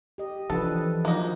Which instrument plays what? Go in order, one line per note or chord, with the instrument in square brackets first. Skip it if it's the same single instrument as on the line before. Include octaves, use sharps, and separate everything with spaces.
[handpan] G4 D#5
[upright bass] E3 [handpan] F3 D4 B4 [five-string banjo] A4
[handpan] F3 F#3 [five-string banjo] A#3 D#4